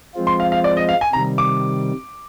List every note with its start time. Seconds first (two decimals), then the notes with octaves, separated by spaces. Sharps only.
0.14 F3 G#3 C4 F4
0.27 C6
0.40 F5
0.52 F5
0.64 D5
0.77 D#5
0.89 F5
1.01 G#5
1.13 C3 D#3 G3 A#5
1.38 D6